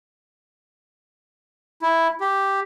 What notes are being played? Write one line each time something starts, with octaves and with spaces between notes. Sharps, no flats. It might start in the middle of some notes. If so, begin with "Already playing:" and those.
E4
G4